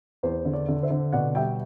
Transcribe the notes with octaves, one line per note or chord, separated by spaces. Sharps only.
E2 C5
D3
D5
D3
C5 E5
D3
B2 D5 F#5
G3 E5 G5